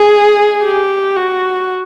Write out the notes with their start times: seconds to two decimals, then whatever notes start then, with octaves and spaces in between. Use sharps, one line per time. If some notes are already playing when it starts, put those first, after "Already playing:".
Already playing: G#4
0.63 G4
1.17 F#4